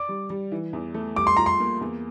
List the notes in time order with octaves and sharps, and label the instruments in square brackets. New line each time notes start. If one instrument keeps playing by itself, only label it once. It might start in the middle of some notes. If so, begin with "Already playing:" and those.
Already playing: [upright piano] D5 [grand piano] D6
[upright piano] G3
G3
E3
E2
A3
[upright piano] G3 [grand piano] D6
[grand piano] C6
[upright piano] F4 [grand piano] A#5
[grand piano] C6
[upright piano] A#3
E2